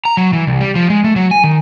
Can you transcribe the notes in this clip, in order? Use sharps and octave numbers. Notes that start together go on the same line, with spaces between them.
A#5
F#3
E3
C2
G3
F3
G#3
A3
F#3
G#5
D#3